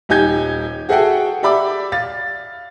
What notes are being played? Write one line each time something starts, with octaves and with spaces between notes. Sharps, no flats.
D#1 D#4 G4 G#5 G6 G#6
F#4 G#4 A4 E5 F#5 G5
G4 D5 E5 B5 D6
F5 A6